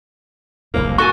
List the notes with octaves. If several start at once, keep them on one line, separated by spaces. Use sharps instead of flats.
F#1 C2 G#2 A#3
F#4 A4 G#5 C#6